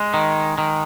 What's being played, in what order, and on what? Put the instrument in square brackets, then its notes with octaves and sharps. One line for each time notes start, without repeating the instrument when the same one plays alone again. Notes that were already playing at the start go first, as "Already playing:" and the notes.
Already playing: [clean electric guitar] G#3
D#3
D#3